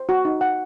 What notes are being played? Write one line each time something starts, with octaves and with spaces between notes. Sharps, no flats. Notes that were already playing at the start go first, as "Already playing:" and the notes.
Already playing: C5
F#4
D#4
F#5